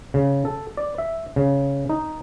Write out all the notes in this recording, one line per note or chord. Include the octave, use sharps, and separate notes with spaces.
C#3
A4
D5
E5
C#3
D#4